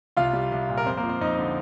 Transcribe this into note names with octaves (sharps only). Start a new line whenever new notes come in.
C2 F4 F5
G3
C2
A#2
A#4
F2 C4 C5
A#3 A#4
F3
C4 C5
F2 D#4 D#5
D3